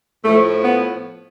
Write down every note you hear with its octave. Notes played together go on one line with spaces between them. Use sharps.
A2 F3 A3
B3